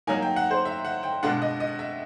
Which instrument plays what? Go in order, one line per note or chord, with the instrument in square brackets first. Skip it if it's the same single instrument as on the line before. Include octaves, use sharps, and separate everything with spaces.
[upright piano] F#3 A#3 D#4 G#5
G5
F#5
C5
E5
F#5
G5
B2 G#3 B3 D4 F4 F#5
D#5
D#5
E5